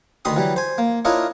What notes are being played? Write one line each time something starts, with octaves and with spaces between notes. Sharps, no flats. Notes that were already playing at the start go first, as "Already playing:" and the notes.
D2 D#3 B5 C6 D#6
E3 F#3 G3
C5 G#5
A#3
D4 E4 F4 A#4 C#5 D#5